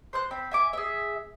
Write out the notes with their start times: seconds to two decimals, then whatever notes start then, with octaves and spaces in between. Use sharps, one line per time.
0.13 C5 C6 F#6
0.31 C4 B5
0.51 E5 G#5 D6
0.73 G#4 E5